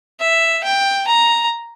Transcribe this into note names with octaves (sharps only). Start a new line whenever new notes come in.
E5
G5
A#5